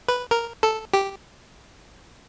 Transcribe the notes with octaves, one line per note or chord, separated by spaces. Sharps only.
B4
A#4
A4
G4